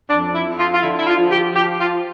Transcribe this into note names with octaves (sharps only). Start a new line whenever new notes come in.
F2 D4
E4
F2
F4
F4
D3 E4
E4
F4
F3
G4
F3 G4
F4